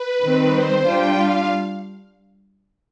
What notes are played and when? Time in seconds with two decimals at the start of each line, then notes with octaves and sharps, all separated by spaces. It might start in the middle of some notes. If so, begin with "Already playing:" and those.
Already playing: B4
0.22 D#3 G3 C4
0.55 C5
0.86 G3 D4 F4 G5
1.17 F5